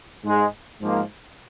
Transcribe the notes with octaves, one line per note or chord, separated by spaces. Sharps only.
G#2 G#3
G#2 F3 A#3